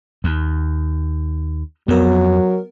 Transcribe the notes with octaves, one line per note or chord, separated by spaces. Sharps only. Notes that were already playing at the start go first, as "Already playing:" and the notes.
D#2
F2 F#3 B3 A#4